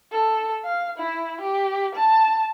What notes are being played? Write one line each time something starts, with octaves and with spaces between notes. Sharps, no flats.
A4
F5
E4
G4
A5